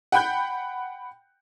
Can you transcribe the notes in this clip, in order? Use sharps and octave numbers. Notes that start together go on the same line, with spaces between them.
F#5 G5 B5 F#6 G6